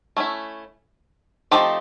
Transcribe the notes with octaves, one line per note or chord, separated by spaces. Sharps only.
A3 C#4 E4
F3 A3 C4 D#4 G4